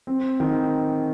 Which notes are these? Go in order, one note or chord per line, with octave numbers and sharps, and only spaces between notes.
C4
D#3